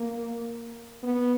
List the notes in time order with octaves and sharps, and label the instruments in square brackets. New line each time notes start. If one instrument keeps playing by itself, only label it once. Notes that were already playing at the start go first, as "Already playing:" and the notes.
Already playing: [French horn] A#3
B3